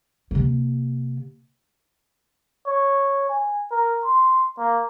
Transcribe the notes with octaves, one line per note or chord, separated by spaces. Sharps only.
C3 A#3
C#5
G#5
A#4
C6
A#3